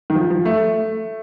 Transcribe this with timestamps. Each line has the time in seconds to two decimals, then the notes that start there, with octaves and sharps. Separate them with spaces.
0.10 D#3
0.15 F3
0.30 F3
0.45 A3
0.60 A3